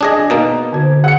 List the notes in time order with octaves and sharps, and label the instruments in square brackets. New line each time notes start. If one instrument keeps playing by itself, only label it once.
[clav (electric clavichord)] D4 G#4 D#5
B2 A#3 D#4
[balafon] D3 F#4 C5
[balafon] G#4 [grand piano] F#5 C#7